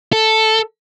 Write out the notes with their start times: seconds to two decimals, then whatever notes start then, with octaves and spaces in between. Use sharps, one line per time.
0.13 A4